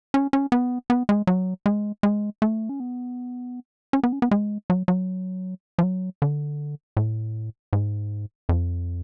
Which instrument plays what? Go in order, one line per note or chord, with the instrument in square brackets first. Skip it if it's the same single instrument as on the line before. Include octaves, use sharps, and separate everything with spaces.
[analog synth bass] C#4
C#4
B3
B3
G#3
F#3
G#3
G#3
A3
C#4
B3
C#4
B3
C#4
B3
G#3
F#3
F#3
F3
F#3
D3
A2
G#2
F2